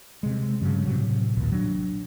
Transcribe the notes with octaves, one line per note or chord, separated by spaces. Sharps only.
C3 G#3
G2 C#3 F#3
A2 C3 F#3
A#1 D#2 A#2
F#3 D4